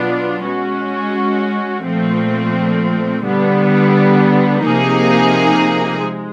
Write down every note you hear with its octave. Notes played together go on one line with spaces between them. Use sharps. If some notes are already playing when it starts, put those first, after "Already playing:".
Already playing: B2 F#3 B3 D4 F4
G#3 C#4 F#4
A#2 F3 A3 C4
D3 G3 B3
C3 F3 A#3 D#4 G#4
G#3